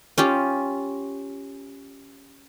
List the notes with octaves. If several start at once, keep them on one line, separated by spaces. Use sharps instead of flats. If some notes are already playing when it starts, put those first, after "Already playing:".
C#4 F4 G4